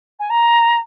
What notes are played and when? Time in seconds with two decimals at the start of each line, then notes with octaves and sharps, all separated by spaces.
0.19 G#5
0.30 A#5